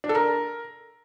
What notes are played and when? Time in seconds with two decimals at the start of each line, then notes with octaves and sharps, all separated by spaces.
0.04 D4
0.09 A4
0.15 A#4